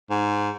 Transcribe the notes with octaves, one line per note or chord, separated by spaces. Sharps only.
G#2